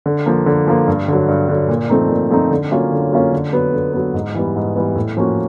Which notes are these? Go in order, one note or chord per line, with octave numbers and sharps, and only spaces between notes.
D3
F3 A#3
D3
F3 A#3
G2
D3 F#3
G2
D3 F#3
A#2
F3 A3 C4 D#4
A#2
F3 A3 C4 D#4
D3
F#3 A#3 C#4 F4
D3
F#3 A#3 C#4 F4
D3
F#3 B3
D3
F#3 B3
G#2
E3 G3 B3
G#2
E3 G3 B3
A2
F3 A#3 C#4 F#4